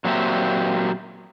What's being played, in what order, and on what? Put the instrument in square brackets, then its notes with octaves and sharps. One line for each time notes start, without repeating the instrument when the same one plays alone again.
[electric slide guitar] A#2 F#3 A#3 C4 G4 E5